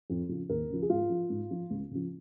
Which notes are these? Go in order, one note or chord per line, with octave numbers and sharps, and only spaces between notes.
F2
C#3 F3
D#2 A#4
C#3 F3
G#4
G#2 F4
F3
G#2
F3
C#2
C#3 F3